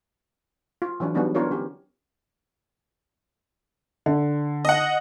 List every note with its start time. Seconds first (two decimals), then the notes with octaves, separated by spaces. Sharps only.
0.82 F4
1.00 E3 F#3 C#4 D4
1.14 F#3 G3 B3 D4 D#4
1.35 B3 D4 E4 F4 A#4 C#5
1.51 D3 C#4 G4
4.06 D3
4.65 D#5 F#5